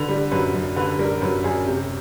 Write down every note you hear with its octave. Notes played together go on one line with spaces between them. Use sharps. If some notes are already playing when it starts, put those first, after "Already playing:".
Already playing: D3 B4
G3
F#2 B4
F#2
D3 B4
G3 A#4
F#2 B4
F#2 G#4
C3 G4